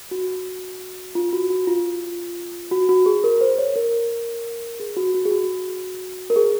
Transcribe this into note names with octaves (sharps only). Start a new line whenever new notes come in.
F#4
F4
F#4
F#4
F4
F#4
F#4
G#4
A#4
C5
C#5
A#4
G#4
F#4
F#4
G#4
F#4
A#4
G#4